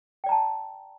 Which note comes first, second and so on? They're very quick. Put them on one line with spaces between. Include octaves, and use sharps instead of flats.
G5 D5 A#5 A5